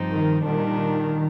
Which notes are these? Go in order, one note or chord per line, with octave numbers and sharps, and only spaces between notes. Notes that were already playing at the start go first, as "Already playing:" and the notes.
Already playing: G2 F3 C4 D#4
D#3
A#2 D#3 G3 D4